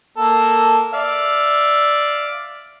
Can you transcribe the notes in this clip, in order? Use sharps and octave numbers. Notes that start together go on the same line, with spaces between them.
A#3 A4
D5 E5 F5